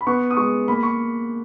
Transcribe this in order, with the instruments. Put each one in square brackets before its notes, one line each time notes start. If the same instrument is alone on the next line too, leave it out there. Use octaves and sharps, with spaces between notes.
[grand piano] B5
B3 C#6
D#6
G#3 C#6
A#3 B5
C#6